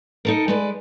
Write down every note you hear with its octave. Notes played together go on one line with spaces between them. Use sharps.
D#4 A4 A#4
G#3 B4 D5